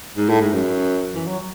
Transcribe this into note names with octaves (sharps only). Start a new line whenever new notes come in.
G#2
A2
G#2
F#2
E3
F#3